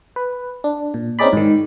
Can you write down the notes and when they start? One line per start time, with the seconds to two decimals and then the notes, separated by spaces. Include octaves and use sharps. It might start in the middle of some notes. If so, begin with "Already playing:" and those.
0.16 B4
0.64 D4
0.94 A#2
1.19 C4 C#4 D#4 G#4 D5 B5
1.33 G#2 D#3